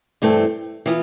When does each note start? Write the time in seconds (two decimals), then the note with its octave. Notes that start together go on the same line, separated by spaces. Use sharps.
0.22 G2 E3 A3 C4
0.86 E3 B3 F4